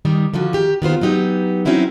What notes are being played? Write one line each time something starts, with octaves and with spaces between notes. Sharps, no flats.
D#3 G3 D#4
D3 D#3 F3 F#4
D#3 G4
D#3 B3 F4 C5
F#3 B3 D#4 G4
F#3 C4 C#4 D#4 E4 F#4